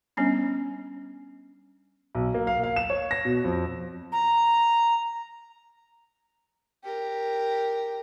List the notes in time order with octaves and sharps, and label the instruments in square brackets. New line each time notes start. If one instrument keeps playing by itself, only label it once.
[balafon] G3 B3 C#4 D4
[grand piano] B1
A#3
F5
F5
E7
C#5
A#6
B2
F2
[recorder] A#5
[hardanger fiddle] G4 A#4